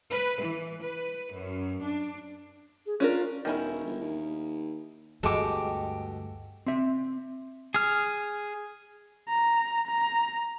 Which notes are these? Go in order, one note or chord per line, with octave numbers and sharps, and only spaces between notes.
B4
E3
B4
F#2
D4
G#4
C#4 D4 F4 A#4
E1 D#3 C#4 E4
G1
D#2
D2 G2 B2 G#3 G4 A4 D6
C4 E5
G#4 F6
A#5
A#5